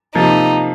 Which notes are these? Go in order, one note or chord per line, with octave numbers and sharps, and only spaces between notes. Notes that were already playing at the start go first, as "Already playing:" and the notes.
C3 F3 A#3 D#4